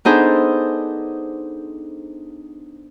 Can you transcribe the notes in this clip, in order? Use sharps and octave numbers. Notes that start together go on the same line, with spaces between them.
B3 D4 D#4 G#4 A4 C5